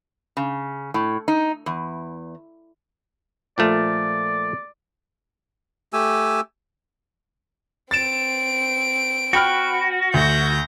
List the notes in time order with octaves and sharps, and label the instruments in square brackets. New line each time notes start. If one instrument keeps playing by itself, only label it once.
[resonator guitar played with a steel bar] C#3
A2
D#4
E2
[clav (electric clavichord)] A#2 F3 A3 [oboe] D5
[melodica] A3 G4 G#5 E6
[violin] C4 D7 [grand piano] A6 E7
[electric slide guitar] F#4 [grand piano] G5 B5 F6
[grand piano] D2 [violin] G6 A#6